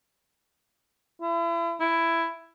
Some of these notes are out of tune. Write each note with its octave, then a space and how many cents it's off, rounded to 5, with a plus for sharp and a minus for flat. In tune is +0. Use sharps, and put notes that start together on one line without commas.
E4 +40
E4 +10